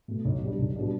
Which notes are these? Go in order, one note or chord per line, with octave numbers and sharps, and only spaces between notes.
B2 A3
B1
B2 G3 D4
B1
B2 G3 D4